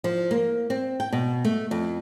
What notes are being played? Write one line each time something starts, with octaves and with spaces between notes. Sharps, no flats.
F3
A#3
C4
G5
B2
A3
F2